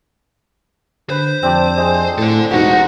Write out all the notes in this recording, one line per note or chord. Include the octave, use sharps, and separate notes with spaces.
D3 B4 C5 B5
F2 C4 D4 G4
G#3 C4
A2 A4 D5
E1 D#4 F#4 G4 F#5